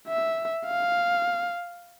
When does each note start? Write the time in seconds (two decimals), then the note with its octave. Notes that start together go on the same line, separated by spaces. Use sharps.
0.08 E5
0.67 F5